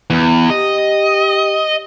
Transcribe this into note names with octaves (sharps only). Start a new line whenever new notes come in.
E2
G4 D#5